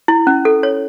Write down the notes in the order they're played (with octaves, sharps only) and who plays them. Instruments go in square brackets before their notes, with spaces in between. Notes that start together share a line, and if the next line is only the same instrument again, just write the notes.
[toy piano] E4
C#4
A4
C#5